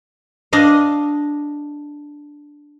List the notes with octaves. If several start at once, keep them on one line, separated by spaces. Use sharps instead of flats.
D4 D#5 F5